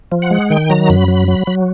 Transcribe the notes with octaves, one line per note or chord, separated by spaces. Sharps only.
F3
F#5
G#3
D#3 G5
F#3 A#5
F#2 B5
F#3
F#3
F#3